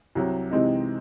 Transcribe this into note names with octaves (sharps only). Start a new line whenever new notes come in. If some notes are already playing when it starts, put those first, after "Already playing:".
C2 C3 F#3
C3 E3 G#3 C4 D#4